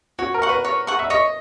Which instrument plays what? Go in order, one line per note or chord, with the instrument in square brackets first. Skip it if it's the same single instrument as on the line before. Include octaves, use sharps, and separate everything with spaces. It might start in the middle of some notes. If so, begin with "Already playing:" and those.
[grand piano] F#4 [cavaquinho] C#5
[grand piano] A#4
[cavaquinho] F#5 C#6
[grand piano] B4
[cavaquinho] C#5
F#5 C#6
[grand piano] E5
[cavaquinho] C#5 [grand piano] D#5